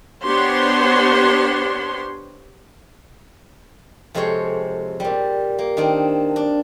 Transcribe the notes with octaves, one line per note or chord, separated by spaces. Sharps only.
B3 D4 G4 C5 C#5 C6
F2 C3 G#3 A4 C5 C#5
A#2 G3
A#3
D#3 C4 D4
D4